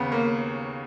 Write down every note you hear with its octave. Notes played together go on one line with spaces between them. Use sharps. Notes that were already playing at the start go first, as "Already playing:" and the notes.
Already playing: D#2 C#3 B3
A#3